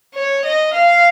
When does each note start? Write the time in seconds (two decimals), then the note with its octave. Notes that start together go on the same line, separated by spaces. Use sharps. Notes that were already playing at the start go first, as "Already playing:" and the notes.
0.15 C#5
0.45 D#5
0.74 F5